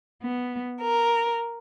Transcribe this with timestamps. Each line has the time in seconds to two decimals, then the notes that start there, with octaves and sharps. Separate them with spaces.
0.22 B3
0.81 A#4